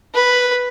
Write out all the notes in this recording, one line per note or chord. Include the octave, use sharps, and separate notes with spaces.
B4